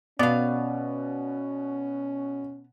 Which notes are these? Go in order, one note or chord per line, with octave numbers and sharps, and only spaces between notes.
B2 B3 C#4 D5 F5